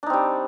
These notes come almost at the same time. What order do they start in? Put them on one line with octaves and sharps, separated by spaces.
D4 D#4 C4 G3